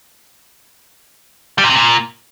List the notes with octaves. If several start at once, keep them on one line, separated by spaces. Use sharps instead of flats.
G3
A#2
C3
A#2